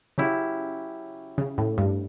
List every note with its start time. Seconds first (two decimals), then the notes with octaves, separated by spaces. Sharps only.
0.18 C#3 F#3 C#4 E4 G4 C#5
1.38 C#3
1.58 A2
1.78 G2